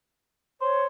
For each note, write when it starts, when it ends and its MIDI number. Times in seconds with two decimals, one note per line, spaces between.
0.61 0.86 72
0.61 0.85 73